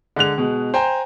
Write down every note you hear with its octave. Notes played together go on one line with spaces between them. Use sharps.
D3 G#3 F#6 F7
B2 G#3
C5 G5 G#5 A#5